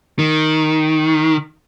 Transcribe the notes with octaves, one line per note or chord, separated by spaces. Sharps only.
D#3